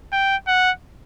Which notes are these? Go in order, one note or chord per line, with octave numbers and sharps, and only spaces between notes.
G5
F#5